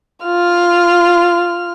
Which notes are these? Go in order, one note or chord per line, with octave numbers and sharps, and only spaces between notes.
F4 F6